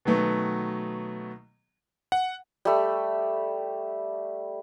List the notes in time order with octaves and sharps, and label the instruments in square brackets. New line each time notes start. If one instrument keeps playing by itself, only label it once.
[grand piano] B2 D#3 F#3 A3 B3
[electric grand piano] F#5
[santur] G3 A3